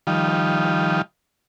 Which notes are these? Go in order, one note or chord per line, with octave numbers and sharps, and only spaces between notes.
D#3 F3 G3